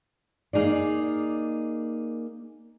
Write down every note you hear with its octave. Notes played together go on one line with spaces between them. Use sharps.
A#3 D#4 G#4 D5